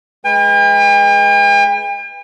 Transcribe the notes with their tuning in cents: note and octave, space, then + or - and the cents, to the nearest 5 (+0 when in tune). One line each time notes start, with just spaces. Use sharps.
G#3 +25 B4 +0 G5 +45